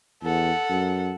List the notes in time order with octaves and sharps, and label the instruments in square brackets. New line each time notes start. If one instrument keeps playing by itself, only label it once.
[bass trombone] E2 [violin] A4 F#5
[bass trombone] F#2